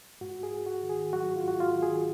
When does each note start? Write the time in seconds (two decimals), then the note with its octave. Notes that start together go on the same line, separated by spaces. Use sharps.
0.21 G#2 F#4
0.43 G#4
0.52 G#2
0.66 F#4
0.83 D#3
0.90 G#4
1.13 F#3 F#4
1.36 F4
1.45 G#2 F#4
1.60 F4
1.76 D#3
1.83 G#4